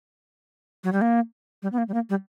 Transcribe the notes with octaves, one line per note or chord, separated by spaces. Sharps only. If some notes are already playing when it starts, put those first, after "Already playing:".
F#3
G3
A#3
G3
B3
A#3
G3
A#3
G3